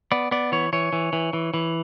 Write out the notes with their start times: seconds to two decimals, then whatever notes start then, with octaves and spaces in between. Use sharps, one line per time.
0.12 B3 D5
0.31 B3 D5
0.52 E3 C#5
0.73 E3 C#5
0.93 E3
1.13 E3
1.33 E3
1.54 E3